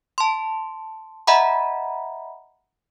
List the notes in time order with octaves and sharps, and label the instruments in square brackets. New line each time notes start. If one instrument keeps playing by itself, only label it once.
[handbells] A5 C6
D#5 E5 F#5 A#5 B5